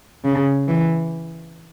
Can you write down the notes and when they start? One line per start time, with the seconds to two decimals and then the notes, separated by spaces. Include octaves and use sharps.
0.25 C#3
0.68 E3